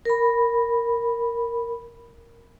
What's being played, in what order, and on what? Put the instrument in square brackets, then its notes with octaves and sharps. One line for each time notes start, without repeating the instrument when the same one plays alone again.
[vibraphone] A#4 B5